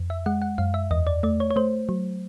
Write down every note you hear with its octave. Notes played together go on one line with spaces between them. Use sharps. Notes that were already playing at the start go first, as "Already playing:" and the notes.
Already playing: F2
E5
G#3 F#5
F#5
F#2 F5
E5
E2 D#5
D5
A3 D5
C#5
C#5
A3 C5
F#3